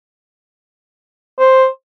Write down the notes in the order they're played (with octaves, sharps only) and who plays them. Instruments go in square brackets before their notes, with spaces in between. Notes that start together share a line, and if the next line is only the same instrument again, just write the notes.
[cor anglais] C5